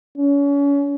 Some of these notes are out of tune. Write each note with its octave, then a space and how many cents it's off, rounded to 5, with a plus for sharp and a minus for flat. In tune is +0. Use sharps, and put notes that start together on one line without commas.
C#4 +35